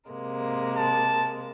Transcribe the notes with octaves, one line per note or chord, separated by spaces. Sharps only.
C3 G#3 A#3
A5